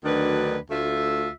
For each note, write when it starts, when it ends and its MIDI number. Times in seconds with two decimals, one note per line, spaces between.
0.05 0.58 38
0.05 0.58 51
0.05 0.58 54
0.05 0.58 62
0.05 0.58 71
0.71 1.30 38
0.71 1.30 57
0.71 1.30 65
0.71 1.30 76